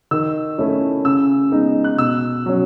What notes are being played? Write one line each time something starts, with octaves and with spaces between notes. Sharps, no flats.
D#3 E6
A3 C#4 E4
C#3 E6
G#3 B3 D#4
F#6
B2 E6
F#3 C#4